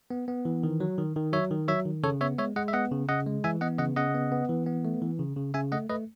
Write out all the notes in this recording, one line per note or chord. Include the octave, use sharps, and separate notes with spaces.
B3
B3
E3
D#3
F#3
D#3
D#3
F#3 C#5 E5
D#3
F#3 C#5 E5
D#3
C#3 A4 C#5
B3 C#5 E5
G#3 C#5 E5
G#3 D#5 F#5
E5
B3 D#5 F#5
C#3
C#3 D#5 F#5
G#3
E3 E5 G#5
B3 D#5 F#5
C#3 D#5 F#5
C#3 D#5 F#5
B3
B3
E3
B3
A3
E3
C#3
C#3
C#3 E5 G#5
A3 D#5 F#5
A3 B4 D#5